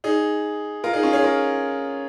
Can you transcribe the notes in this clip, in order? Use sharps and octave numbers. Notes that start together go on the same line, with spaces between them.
D#4 G#4
F4 A#4
D#4 G#4
C#4 F4
G#4 C#5
F4 A#4